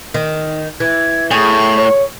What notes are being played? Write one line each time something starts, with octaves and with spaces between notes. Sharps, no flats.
D#3
E3 G#6
A2 G#4 C#6
C#5